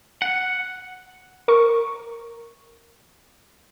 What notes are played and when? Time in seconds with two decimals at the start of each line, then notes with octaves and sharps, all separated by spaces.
0.22 F#5
1.48 A#4 C#6